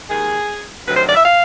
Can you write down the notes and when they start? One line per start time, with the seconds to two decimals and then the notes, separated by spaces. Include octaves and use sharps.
0.09 D#2 D#3 G#3 G#4
0.86 D2 C3 D#3 F#3 B4
0.95 C5
1.05 D5
1.15 E5
1.24 F5